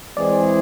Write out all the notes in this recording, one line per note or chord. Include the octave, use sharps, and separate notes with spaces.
E3 G#3 C4 E4 G#4 D5